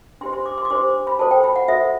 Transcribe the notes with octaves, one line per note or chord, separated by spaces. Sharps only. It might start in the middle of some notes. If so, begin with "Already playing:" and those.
D4 G4 C5 C6
C6
D6
C6
D6
D4 G4 C5 C6
B5
F#4 A4 C5 A5
G5
B5
F#5
F#4 A4 C5 E5